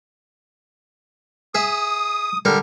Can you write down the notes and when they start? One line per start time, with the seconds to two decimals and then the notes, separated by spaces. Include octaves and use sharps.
1.55 G#4 E5 D#6
2.45 D3 G3 A#4